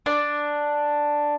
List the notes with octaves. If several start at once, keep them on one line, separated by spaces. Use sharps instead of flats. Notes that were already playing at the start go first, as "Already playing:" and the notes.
D4